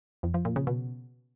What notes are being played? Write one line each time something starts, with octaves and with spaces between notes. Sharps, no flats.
F2
F3
A#2
C#3
B2